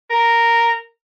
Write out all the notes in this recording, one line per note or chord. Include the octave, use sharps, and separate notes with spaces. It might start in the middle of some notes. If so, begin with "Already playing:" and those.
A#4